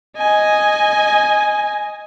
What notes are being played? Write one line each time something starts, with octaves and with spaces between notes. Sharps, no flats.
D#5 G#5